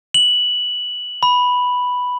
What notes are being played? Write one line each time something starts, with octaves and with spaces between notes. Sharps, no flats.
F#7
B5